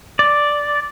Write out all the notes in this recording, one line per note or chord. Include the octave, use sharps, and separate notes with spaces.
D5